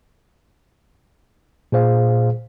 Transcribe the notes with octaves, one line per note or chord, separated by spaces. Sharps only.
A#2 G#4 C5 F5